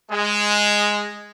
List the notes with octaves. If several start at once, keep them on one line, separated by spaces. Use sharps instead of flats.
G#3